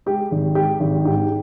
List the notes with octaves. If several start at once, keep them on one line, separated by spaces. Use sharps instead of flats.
G#3 G4
G#1
G#3 G4
G#1
G#2 G4